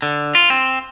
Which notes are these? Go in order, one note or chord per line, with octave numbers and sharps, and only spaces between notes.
D3
F4
C4